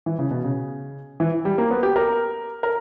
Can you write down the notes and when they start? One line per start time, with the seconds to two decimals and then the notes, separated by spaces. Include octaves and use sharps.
0.06 E3
0.19 C#3
0.31 B2
0.44 C#3
1.20 E3
1.45 G3
1.58 A#3
1.71 B3
1.83 G4
1.96 A#4
2.63 A#4